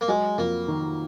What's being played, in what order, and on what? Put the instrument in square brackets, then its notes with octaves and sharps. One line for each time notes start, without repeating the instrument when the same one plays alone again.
[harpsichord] A#3
[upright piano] F#3 [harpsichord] G#3
[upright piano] F2 [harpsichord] A#3
[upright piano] D#3